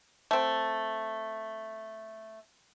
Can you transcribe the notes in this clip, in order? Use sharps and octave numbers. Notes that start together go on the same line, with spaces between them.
A3 C4